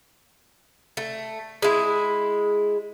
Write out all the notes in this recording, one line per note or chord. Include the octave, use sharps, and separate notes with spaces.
A3
G#3 E4